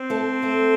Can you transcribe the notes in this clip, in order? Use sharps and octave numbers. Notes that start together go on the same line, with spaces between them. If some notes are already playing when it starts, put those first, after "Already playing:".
Already playing: C4
A3 A4
A3 A4